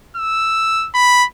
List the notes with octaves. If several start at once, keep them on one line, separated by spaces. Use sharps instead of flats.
E6
B5